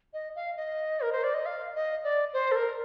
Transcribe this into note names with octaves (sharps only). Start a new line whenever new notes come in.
D#5
F5
D#5
A#4
C5
D5
D#5
F5
D#5
D5
C5
A4
A#4